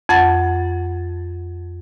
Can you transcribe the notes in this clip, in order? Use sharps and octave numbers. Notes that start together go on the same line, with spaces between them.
F2 F#5 A6